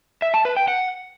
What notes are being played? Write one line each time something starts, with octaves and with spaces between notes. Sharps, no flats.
E5
A5
B4
G5
F#5